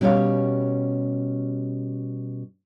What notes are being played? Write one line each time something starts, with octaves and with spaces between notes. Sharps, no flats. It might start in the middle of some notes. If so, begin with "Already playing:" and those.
B2 G3 C#4 G4 C#5 F5